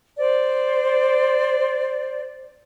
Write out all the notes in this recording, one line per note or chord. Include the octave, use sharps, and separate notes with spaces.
C5 D5